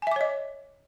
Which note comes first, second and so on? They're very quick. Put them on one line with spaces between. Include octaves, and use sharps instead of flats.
G#5 E5 D6 C#5 D#5